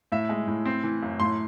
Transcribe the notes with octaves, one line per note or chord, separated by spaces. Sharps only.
A2 E5
G#3
A2
C4
E3
F#2
A2 C6